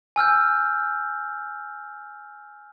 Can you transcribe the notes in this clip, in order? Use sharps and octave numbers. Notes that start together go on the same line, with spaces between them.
G#5 E6 F6 G6